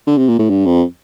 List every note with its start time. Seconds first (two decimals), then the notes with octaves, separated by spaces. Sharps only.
0.07 D3
0.18 C3
0.28 A#2
0.39 A2
0.50 G2
0.66 F2